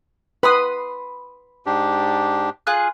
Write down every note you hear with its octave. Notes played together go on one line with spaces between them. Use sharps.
B4 B5 C6 D#6
G#2 D4 G4
F4 G#4 F#6